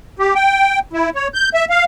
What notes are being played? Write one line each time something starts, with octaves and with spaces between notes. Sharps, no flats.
G4
G5
E4
C#5
G6
E5
F5